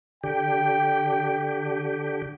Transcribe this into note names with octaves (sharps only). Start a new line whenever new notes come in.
D3 G4 G5